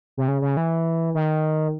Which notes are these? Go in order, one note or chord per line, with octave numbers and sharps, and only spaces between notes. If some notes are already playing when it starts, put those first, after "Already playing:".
C3
C#3
C#3
E3
D#3